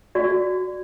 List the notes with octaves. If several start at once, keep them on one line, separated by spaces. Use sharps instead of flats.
F#4 D5